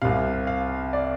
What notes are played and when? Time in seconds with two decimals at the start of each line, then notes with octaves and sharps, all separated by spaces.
0.02 C2 C3 F5
0.47 F5
0.93 D5